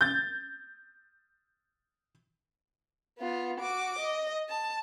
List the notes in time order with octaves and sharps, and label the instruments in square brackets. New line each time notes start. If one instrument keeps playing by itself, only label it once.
[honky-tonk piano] G6 A6
[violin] B3 F4
F#4 D6
D#5
A5